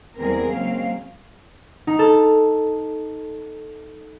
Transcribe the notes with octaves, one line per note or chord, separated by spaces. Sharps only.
E2 G3 G#3 C4 G#4 A#4
C#3 F#3 G#3 A#3 C4 F5
D#4
A4